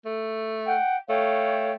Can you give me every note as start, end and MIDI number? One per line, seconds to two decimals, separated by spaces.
0.05 0.77 57
0.67 0.97 78
0.67 0.97 79
1.09 1.76 57
1.09 1.73 73
1.09 1.73 77
1.09 1.73 79